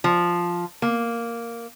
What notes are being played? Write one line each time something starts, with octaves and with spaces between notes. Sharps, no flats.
F3
A#3